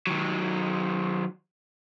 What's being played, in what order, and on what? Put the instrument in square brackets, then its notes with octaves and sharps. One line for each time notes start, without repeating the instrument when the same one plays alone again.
[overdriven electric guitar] D#3 F#3